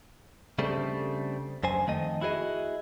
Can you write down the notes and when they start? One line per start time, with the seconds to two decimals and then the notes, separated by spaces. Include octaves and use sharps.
0.59 C#3 G3 A3 C4 D4
1.64 F#2 C5 G#5
1.87 F2 D#3 A3 D#5
2.21 E4 F#4 G#4 A#4 D#5